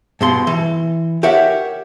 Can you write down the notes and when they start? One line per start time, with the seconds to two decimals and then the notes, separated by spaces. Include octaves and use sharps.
0.21 G2 B2 C6
0.47 E3
1.23 G4 A#4 C#5 E5 F#5